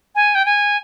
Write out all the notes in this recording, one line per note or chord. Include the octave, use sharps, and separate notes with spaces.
G#5
G5
G#5